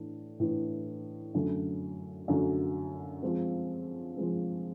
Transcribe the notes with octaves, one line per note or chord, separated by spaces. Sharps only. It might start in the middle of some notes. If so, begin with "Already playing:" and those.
Already playing: A2 E3 A3 D4
A2 E3 A3 D4
F#2 D3 F#3 A3
F#2 D3 F#3 A3
F3 G#3 C4
F3 G#3 C4